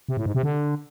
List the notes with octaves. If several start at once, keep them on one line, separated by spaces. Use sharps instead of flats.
C3
A2
G#2
C3
D3